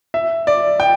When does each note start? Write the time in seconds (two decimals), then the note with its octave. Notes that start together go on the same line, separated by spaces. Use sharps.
0.14 E5
0.47 D5
0.80 G5